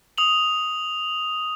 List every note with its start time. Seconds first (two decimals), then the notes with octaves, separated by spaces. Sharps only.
0.18 D#6 F7 F#7